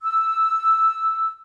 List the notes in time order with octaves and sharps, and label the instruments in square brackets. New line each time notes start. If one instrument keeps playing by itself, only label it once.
[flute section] E6